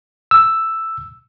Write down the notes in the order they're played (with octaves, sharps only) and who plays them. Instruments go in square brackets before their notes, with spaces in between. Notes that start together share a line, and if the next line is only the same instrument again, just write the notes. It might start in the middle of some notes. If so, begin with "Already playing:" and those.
[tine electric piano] E6